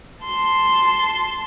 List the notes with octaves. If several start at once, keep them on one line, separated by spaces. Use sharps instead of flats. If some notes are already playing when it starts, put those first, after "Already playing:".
A5 C6